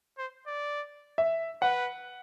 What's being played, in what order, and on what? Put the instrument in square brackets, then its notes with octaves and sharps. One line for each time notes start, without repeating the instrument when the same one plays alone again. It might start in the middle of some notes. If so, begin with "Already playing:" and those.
[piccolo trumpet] C5
D5
[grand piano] E5
[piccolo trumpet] B4 [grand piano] F#5